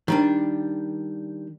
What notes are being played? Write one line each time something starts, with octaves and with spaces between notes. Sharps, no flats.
D#3 G3 D4